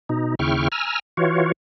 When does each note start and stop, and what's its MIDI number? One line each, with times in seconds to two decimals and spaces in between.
0.09 0.35 47
0.09 0.35 63
0.39 0.68 39
0.39 0.68 49
0.39 0.68 64
0.39 0.68 79
0.39 0.68 85
0.39 0.68 89
0.72 0.99 80
0.72 0.99 82
0.72 0.99 88
0.72 0.99 89
1.17 1.52 52
1.17 1.52 65
1.17 1.52 66
1.17 1.52 73